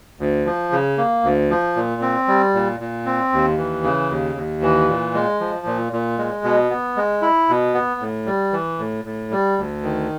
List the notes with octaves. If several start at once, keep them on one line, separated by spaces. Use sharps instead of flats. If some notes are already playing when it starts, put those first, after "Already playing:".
D2
F3
C#3
A#3
D2
F3
A#2
C4
G3
A#2
A#2
C4
D#2
E3
C#3
D#2
D#2
E3
A#2
G#3
F3
A#2
A#2
G#3
B2
B3
G#3
E4
B2
B3
A2
G3
E3
A2
A2
G3
D2
D#3